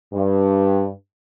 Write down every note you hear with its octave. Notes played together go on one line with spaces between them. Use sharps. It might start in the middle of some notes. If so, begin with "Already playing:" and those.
G2